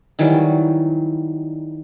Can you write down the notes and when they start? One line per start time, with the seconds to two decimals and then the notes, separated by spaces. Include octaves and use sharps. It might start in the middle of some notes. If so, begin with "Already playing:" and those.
0.19 D#3 E3 F#3 G3